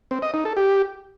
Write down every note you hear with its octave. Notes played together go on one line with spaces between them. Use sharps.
C4
D#5
D#4
A4
G4